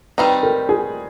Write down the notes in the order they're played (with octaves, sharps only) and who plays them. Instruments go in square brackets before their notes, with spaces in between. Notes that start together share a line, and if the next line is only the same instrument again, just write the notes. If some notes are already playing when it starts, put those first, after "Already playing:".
[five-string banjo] D#3 G3 C4 D#4 [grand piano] B4
[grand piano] A#4
G#4